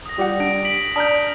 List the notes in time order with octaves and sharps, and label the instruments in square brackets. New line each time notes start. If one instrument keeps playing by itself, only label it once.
[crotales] D#6 A#6
[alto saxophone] G3 [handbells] F4 F#5
[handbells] D4 [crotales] D7
[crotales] B6 D7 F#7
[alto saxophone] D4 [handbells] A5 A#5 G6 [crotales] D#6 F6